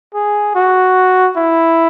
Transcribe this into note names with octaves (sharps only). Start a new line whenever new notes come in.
G#4
F#4
E4